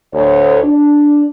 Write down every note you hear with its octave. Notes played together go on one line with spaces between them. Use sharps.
D2 C#5
D4